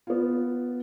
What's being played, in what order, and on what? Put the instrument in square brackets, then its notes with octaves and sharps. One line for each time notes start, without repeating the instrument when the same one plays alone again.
[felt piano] B3 F4